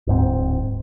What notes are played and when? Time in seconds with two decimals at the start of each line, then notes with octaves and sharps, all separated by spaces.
0.07 D1 G#2 C4